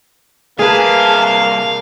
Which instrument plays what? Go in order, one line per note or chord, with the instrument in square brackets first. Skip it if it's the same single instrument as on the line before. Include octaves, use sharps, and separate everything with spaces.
[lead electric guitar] C2 A5 [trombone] A#3 [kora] G#4 B4 [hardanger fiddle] F5